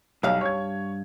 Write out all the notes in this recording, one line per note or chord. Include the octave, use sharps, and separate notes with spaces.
B1 G2 F5
C#5 G#6